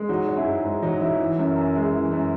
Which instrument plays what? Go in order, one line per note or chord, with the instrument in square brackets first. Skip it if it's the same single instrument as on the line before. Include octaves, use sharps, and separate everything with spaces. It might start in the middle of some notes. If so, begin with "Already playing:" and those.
Already playing: [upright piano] G#3
F#3 D#4 F#4
F#3
E4 G#4
G#2
G#2
F#3 D#4
F#3 E4
E3
F#2
F#2
G#3
E3
F#2